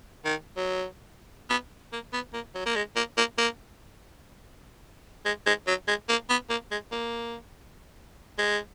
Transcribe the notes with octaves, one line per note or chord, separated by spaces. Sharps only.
D#3
F#3
B3
A#3
B3
A#3
F#3
A#3
G#3
A#3
A#3
A#3
G#3
G#3
F#3
G#3
A#3
B3
A#3
G#3
A#3
G#3